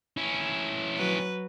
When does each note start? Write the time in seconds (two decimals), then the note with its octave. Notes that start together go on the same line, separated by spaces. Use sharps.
0.17 C#4 E4
0.96 F#3 B4